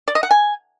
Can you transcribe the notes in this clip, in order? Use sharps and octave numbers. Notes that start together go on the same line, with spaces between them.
D5
D#5
F#5
G#5